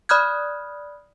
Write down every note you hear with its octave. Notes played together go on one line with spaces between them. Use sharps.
D5 B5 D#6 F6 F#6 G#6